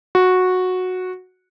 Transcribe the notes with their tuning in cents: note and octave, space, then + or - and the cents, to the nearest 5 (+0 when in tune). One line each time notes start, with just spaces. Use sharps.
F#4 -10